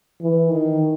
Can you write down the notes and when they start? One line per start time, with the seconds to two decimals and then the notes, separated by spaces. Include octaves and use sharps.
0.21 E3
0.51 D#3